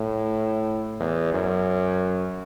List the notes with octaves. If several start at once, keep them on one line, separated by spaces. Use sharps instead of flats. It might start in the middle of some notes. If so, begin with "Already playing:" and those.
Already playing: A2
E2
F#2